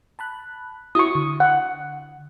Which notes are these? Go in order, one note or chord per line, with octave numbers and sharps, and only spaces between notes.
A5 B5 F#6
E4 F#4 C#6 D#6
D3
F#5